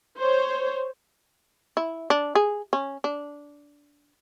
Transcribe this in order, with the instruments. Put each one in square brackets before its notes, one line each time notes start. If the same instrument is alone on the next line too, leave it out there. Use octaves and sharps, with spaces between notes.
[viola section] C5 C#5
[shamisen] E4
D4
G#4
C#4
D4